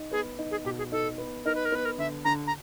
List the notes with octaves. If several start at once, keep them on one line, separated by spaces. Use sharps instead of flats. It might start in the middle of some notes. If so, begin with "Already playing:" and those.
Already playing: D#4
B3 G#4
D#4
G#4
B2 G4
G#4
D#4 A4
B3
D#4 A#4
B4
A#4
B3 B4
A#4
D3 E5
D3 A#5
A#5